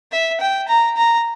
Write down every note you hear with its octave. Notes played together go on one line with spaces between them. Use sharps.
E5
G5
A#5
A#5